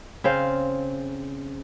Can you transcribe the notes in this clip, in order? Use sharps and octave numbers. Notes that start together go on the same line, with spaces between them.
C#3 C4 C5 F5